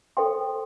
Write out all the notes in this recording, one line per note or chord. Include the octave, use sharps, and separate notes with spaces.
A4 C5 G5 C6